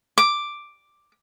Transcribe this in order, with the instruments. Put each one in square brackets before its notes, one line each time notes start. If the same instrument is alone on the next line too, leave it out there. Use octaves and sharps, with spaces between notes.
[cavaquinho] D6